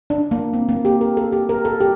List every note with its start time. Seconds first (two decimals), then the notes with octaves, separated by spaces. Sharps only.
0.10 D4
0.31 A#3
0.54 C4
0.69 A#3
0.85 G4
1.01 A#4
1.17 A4
1.32 G4
1.49 A#4
1.65 A4
1.81 G4